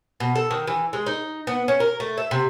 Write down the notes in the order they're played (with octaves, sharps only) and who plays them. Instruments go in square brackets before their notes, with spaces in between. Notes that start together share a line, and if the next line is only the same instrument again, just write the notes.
[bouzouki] B2
A4
D#3
E3
G#3
D#4
B3
C#4
A#4
A3
E5
C3